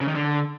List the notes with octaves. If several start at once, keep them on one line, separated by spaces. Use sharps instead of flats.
C#3
D#3
D3